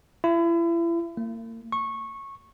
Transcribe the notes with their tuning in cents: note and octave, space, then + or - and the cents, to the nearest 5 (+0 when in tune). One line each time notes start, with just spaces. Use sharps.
E4 +35
A#3 -40
C#6 -15